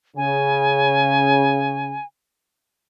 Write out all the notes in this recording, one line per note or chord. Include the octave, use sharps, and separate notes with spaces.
C#3 G#5